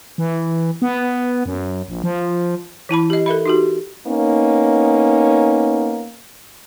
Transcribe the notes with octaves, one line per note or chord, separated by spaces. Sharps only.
E3
B3
F#2
A#1
F3
E3 E4 A5 B5
G4 D#5
A4 A#4 E5 B5
D#4 F#4 G4
A#3 B3 C#4 D#4